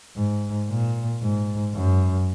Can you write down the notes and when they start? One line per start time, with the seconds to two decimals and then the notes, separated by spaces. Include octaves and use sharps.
0.16 G#2
0.69 A#2
1.22 G#2
1.75 F#2